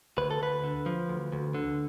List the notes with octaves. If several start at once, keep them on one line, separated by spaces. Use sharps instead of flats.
D2 B4
A4
D2 B4
D3
F3
D2
D2
D3